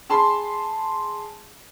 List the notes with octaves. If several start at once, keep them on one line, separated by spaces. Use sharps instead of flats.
G#4 A5 B5 C6